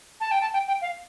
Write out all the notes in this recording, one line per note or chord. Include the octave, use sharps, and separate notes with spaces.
A5
G5
A5
G5
G5
F5